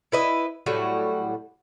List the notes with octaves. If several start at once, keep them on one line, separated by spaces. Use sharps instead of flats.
E4 B4 D#5
A2 F#3 G3 F#4